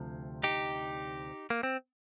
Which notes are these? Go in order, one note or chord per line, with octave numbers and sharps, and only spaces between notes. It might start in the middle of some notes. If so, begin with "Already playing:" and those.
Already playing: D2 C3 F3
D#4 G4
A#3
C4